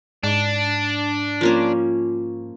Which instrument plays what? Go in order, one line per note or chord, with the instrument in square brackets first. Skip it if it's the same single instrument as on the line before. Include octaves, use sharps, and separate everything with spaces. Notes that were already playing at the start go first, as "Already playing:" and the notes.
[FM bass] G#2 [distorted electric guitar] D4
[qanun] F3 A#3 C#4